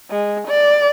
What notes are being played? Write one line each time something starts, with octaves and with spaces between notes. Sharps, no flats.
G#3
D5